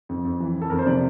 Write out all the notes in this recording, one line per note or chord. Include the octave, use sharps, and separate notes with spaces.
F2
F2
E3
F2
A4
F2 A#4
C5
C3 D5